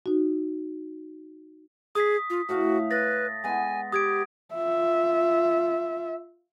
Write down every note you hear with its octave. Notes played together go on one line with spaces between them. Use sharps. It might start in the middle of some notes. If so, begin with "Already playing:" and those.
D#4 F#4
G#4 D#6 B6
F4
A2 F#4 F5
B4 A6 A#6
G#3 B3 G#5
G4 D#6 G#6 D7
F4 E5